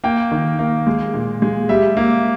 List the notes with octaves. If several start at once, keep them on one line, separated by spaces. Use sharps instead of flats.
A#3 G5
D#3
A#3
G#3
A#2
G#3
G3 E5
A#3